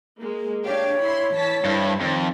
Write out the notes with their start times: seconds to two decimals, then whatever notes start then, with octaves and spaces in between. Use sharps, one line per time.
0.20 G#3 A#3
0.65 D4 G4 C#5 F5
1.00 E4 B5 C6
1.34 E3 A5 B6
1.65 G2 E4 A4 C5
2.01 F2 D#3